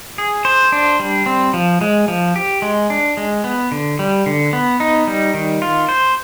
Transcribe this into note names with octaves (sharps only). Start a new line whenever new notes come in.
G#4
C5
D4
G3
C4
F3
G#3
F3
G4
G#3
D4
G#3
B3
D3
G3
D3
B3
D#4
G3
D#3
F4
C5